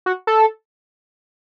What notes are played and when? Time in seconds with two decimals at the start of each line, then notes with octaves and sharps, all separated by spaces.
0.06 F#4
0.27 A4